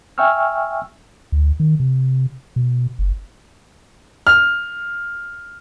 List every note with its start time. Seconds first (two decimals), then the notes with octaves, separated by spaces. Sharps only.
0.18 E5 G5 G#5 C#6 E6 F6
1.32 D2
1.60 D#3
1.80 C3
2.56 B2
2.99 F#1
4.27 F6